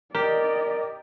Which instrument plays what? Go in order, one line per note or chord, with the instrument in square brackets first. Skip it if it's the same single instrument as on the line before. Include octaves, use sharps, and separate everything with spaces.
[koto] G4 [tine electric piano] A#4 [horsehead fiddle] D5 D#5